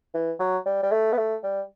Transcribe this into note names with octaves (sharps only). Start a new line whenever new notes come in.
E3
F#3
G3
G3
A3
B3
A3
G3